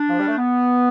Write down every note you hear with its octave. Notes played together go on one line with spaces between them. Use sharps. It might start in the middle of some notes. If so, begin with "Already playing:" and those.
Already playing: D4
F3
G3
A3
B3